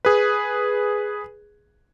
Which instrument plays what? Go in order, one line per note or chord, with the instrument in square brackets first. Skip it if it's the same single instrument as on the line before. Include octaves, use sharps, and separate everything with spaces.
[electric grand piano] G#4 B4